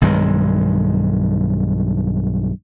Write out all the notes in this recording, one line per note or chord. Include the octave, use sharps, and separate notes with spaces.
B1 G2 D#3 G#3